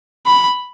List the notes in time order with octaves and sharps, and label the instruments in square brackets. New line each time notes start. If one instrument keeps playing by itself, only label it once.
[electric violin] B5